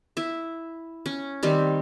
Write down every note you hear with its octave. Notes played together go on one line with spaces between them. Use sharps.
E4 E5
C#4
D#3 G3 C4